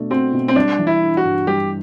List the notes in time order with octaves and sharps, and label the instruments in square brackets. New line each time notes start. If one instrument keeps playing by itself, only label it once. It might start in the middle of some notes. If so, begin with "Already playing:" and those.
Already playing: [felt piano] B2 A3 D4
[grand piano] C4 [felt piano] F#4
[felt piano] B2
[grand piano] C4
[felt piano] G3 [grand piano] D4
[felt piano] E3
[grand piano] E4
[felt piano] D4
[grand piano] F#4
[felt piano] G2
[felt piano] G3 [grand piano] G4